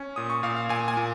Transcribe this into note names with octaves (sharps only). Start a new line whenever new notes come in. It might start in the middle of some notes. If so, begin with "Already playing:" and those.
Already playing: C#4
A#2 D#6
C#6
A#2 F5
F5
A#2 G#5
G#5
A#2